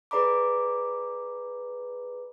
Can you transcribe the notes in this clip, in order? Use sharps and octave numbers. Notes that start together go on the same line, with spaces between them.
G#4 B4 D5 A#5 B5 D6